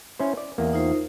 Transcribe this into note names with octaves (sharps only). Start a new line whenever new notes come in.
C#4 E4 C5
D5
E2 A#3
D#4 F4 C5